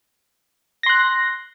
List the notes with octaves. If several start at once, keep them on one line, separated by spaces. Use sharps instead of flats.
C6 F#6 A#6